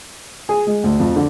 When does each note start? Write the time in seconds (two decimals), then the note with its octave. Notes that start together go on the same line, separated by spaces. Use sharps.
0.49 G#4
0.67 G#3
0.84 D2
1.00 F2
1.16 D3